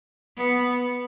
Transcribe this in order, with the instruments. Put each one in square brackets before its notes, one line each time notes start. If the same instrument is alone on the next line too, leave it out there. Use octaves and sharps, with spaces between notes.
[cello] B3